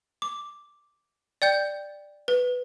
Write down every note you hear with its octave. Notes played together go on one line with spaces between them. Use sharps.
D6
D5 G5 G6
B4